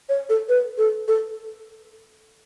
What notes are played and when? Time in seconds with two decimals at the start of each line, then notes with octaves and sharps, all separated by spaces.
0.09 C#5
0.30 A4
0.49 B4
0.78 A4
1.08 A4